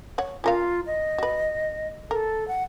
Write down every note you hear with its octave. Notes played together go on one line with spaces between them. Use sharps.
C#5 F#5
C#4 F4 A#4 F5
D#5
F#4 B4
A4 A#4
F#5